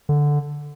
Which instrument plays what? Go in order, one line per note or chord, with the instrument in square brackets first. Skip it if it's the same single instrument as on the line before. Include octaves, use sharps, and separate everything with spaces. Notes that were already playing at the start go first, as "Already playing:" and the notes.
[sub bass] D3